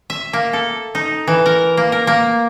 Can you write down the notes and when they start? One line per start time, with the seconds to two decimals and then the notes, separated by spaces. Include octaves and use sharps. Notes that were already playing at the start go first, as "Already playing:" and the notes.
0.10 E5
0.33 A#3
0.53 A4
0.95 D#4
1.27 E3
1.46 A#4
1.77 A#3
1.92 A#4
2.07 A#3